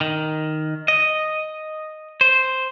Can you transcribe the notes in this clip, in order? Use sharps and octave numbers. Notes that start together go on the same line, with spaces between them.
D#3
D#5
C5